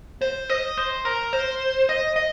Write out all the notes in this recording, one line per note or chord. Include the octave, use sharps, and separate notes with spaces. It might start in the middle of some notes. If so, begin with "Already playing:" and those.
C5
D#5
C5
A#4
C5
D#5
D#5